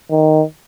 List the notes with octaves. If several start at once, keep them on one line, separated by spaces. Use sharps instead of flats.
D#3